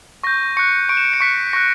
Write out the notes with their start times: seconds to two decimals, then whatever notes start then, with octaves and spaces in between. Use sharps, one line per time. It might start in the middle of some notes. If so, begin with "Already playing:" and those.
0.24 C#6 G6 A#6
0.57 C#6 F#6 C#7
0.89 C#6 D7
0.92 F#6
0.97 E7
1.05 D7
1.14 C#7
1.20 C#6 F#6 B6
1.53 C#6 F#6 A#6